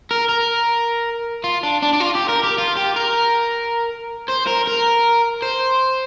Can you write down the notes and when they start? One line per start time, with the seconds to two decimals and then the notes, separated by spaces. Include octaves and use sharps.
0.11 A#4
0.29 A#4
1.44 F4
1.63 D4
1.82 D4
1.93 D4
2.00 F4
2.15 G4
2.29 A#4
2.44 G4
2.58 F4
2.77 G4
2.96 A#4
4.29 C5
4.47 A#4
4.67 A#4
5.42 C5